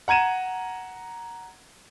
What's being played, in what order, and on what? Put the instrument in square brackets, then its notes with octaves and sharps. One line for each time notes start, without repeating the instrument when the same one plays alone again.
[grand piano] F#5 A#5 G#6 D#7 E7